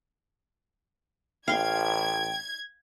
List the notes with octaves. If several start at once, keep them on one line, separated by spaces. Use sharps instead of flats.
A1 F5 G5 C6 G#6